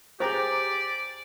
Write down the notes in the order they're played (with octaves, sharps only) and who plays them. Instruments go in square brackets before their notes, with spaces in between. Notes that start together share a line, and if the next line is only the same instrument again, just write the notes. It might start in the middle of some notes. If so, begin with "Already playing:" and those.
[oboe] G4 [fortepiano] G#4 G5 A#5 [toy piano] C5 [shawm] D5